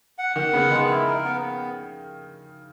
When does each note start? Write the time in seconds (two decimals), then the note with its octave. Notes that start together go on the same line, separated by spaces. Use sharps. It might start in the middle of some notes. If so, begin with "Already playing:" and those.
0.18 F#5
0.36 D#3 F#5
0.52 C#3 B3
0.70 D#3 G#3
0.89 E4
1.06 A#4
1.24 B3
1.41 B3